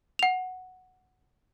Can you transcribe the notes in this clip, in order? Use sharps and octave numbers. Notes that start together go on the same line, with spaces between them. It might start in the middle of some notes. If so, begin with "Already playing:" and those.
F#5 F7